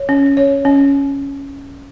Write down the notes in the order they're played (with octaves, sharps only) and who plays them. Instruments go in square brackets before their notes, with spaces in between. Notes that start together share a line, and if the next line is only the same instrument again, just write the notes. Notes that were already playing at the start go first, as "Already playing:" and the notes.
Already playing: [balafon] C#5
C#4
C#5
C#4